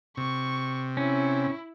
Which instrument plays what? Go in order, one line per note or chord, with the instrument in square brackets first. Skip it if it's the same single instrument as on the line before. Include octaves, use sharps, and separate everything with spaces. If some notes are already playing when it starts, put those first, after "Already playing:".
[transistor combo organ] C3 [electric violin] C#6
[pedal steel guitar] C#4 [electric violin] E4